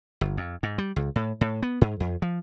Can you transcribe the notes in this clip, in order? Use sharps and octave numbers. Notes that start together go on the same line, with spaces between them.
G1
F2
G#2
G3
C#2
A2
A2
B3
G#2
F2
F3